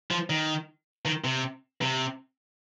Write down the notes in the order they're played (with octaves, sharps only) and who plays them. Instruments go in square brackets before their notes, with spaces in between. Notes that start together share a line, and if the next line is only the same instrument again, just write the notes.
[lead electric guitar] F3
D#3
D#3
C3
C3